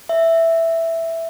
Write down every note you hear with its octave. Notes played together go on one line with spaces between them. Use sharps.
E5